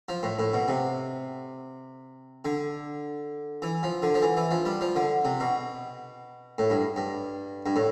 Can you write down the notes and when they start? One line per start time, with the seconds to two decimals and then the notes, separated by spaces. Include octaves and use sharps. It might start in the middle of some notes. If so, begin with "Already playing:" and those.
0.09 F3
0.23 A2
0.39 A2
0.53 B2
0.68 C3
2.45 D3
3.62 E3
3.83 F3
4.02 D3
4.14 F3
4.22 E3
4.37 E3
4.51 F3
4.66 G3
4.81 F3
4.96 D3
5.25 C3
5.40 B2
6.58 A2
6.70 G2
6.96 G2
7.66 G2
7.76 A2